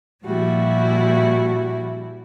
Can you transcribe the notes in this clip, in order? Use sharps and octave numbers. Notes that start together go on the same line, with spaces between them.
A#2 F3 G3 E4 F#4